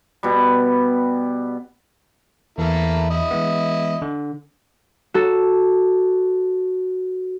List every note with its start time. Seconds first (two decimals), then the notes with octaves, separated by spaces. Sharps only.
0.23 B2 G3
2.58 E2 E3 A#3 E4 A4
3.10 E4 D#5
3.31 E3 G#3 B3
4.02 D3
5.14 F#4 A4